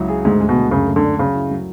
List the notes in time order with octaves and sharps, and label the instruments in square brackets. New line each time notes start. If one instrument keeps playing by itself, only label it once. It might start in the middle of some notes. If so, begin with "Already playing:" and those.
Already playing: [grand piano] C#2 F#3 E4
G#4
[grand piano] D2 [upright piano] G#2
[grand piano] G#3
[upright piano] B2
[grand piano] D2
[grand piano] F#2 [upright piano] C#3
[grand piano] A3
[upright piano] D3
[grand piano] D4
[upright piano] C#3 [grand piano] F#3
[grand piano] E4
F#3